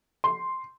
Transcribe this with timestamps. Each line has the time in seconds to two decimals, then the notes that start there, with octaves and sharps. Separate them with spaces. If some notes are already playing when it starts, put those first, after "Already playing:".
0.24 C6